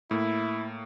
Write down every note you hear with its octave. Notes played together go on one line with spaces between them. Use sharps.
A2 A#3 E4